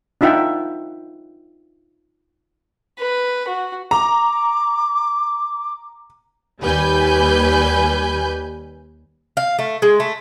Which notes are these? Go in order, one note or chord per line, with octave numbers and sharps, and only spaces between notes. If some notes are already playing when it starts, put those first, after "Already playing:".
D4 D#4 F4 E5 F#5 G5
B4
F#4
A#5 D6
D#2 G3 B4 G#5 G6
F5
A3
G#3
A3